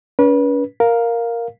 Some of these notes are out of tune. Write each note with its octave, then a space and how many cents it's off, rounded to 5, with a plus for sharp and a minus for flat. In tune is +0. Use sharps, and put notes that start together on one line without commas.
C#4 +40 B4 -30
A#4 +0 F5 +5